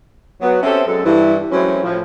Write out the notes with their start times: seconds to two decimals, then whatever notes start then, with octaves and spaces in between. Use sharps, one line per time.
0.41 F#3 B3
0.63 C4 C#4 G4 A4 C5 E5
0.87 F#2 G#3 A4
1.04 G2 E3 E4
1.52 E3 F#3 G#3 A3 C4 C#4
1.84 A2 F3